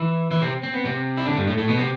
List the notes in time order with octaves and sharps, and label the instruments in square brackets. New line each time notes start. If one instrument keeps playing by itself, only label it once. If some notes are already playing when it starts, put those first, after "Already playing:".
Already playing: [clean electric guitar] E3 E4
E3 E4
C3 C4
C4
B3
C3 C4
E4
D3 D4
G2 G3
A2 A3
A2 A3
B2 B3
C3 C4